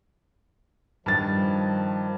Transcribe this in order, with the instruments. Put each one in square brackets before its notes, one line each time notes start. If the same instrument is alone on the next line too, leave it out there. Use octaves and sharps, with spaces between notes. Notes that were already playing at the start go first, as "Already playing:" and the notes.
[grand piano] G2 A6 [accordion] D#3 F3